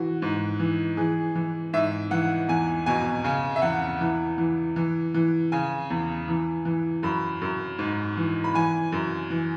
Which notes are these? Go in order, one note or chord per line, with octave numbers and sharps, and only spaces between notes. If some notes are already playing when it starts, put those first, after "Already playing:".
Already playing: E3 F#4
G#2
E3
E3 G#4
E3
G#2 E5
E3 F#5
E2 G#5
B2 G#5
C#3 G#5
E5
E2 F#5
E3
E3
E3
E3
C#3 G#5
E2
E3
E3
F#2 B5
F#2
G#2
E3
B5
E3 G#5
F#2
E3